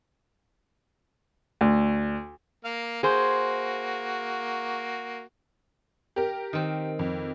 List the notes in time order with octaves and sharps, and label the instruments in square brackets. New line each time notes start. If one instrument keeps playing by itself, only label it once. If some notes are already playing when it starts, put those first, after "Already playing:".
[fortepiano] D2
[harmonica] A#3 F5 F6
[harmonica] A#3 F#4 [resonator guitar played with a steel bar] G#4 C5
[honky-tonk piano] G4 A#4
[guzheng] D#3 C4
[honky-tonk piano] F2